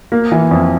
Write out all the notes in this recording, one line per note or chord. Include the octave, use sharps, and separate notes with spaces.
A#3
E3
F2